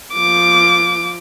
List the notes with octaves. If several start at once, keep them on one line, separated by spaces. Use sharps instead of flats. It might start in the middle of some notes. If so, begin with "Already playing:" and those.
F3 D6